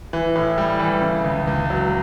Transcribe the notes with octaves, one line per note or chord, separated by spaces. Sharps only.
E3
A2
G3
E3
C#3
C#2
C#2
F#3